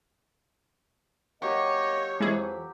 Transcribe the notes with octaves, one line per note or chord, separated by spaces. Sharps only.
F#3 A#3 G4 C#5 D#5
F2 E3 G#3 E4 G#4 B5